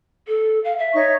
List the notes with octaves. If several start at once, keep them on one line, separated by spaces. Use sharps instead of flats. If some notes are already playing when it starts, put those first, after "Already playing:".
A4
F5
E5
D#4 C#5 C#6